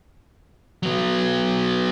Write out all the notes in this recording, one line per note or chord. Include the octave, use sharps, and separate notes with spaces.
F#3 B3